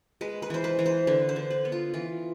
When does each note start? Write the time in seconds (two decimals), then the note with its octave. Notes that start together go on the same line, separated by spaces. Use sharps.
0.21 G#3 B4
0.42 B4
0.50 E3 C5
0.64 B4
0.79 E3
0.86 C5
1.07 D3 B4
1.29 C5
1.36 D3
1.50 B4
1.65 B3
1.72 F4
1.94 E3 F4